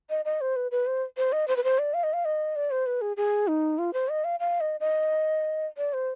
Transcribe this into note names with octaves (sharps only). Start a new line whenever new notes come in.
D#5
D#5
C5
B4
B4
C5
C5
D#5
C5
B4
C5
D5
F5
D#5
F5
D#5
D5
C5
B4
G#4
G#4
D#4
F4
C5
D#5
F5
F5
D#5
D#5
D5
C5